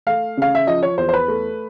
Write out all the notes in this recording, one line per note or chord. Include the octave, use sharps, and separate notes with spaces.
A3 F5
C#3 F5
E5
F3 D#5
C#5
E2 C5
C5
B4
A3